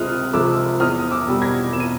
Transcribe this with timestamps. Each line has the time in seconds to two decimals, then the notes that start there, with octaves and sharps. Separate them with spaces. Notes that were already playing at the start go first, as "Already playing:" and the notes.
Already playing: C#2 C3 G#3 D#6 F6 F#6
0.33 C3 F3 G#3 D6 E6
0.80 E2 D#6 F6
0.99 D#6
1.11 D6 E6
1.27 B2 G3
1.42 G#6 A#6
1.73 E2 E7
1.80 D#7